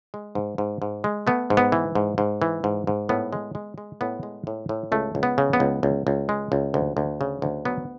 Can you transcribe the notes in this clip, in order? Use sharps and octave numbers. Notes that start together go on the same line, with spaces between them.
G#3
G#2
G#2
G#2
G#3
A3 B3
G#2
B3
E3
G#2
G#2
E3
G#2
G#2
A2 B3
G#3
G#3
G#3
A2 B3
G#3
A2
A2
C#2 A3
C#2
B3
C#3
B3
C#2
C#2
C#2
G#3
C#2
D2
D2
C#3
D2
F#3 B3